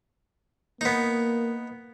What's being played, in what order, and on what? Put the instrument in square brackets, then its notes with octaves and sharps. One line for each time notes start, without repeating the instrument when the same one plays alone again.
[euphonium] A#3 [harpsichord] B3 D#4